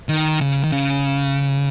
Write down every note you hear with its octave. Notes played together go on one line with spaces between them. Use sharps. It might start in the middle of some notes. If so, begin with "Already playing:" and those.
D#3
C#3
D#3
C#3